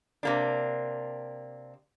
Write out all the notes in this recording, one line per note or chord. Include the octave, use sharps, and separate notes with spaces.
C3 A#3 D4